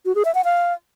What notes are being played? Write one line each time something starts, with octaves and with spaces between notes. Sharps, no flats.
F#4
G#4
E5
F#5
F5